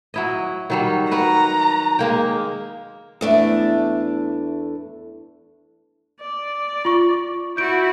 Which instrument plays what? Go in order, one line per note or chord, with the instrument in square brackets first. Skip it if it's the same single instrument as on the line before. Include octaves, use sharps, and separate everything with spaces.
[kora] F#3 E4 D#5
D#3 F#3 G3
[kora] F#4 A#4 B4 [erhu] A#5
[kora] G#3 A#3 G5
[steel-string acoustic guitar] E2 A3 D4
[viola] D5
[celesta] F4 C#6
[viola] E4 F#4 [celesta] G6 D7